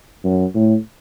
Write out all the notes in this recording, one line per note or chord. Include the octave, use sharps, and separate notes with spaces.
F#2
A2